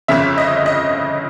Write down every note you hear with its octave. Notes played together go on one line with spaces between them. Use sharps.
G1 F2 C#3 E5
D#5
D#5